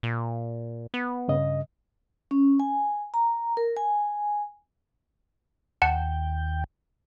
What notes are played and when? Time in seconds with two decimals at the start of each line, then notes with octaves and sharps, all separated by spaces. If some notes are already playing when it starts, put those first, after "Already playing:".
0.03 A#2
0.94 B3
1.28 G2 C#3 D#5
2.31 C#4
2.60 G#5
3.14 A#5
3.57 A#4
3.77 G#5
5.82 D#2 F#5 G5 A5